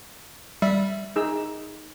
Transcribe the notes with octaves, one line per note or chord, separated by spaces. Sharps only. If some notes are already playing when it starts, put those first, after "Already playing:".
G3 E5
D#4 G#4 E6